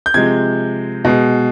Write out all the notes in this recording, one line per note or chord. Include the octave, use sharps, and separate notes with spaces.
G6
C3 F3 G#3 G#6
B2 G#3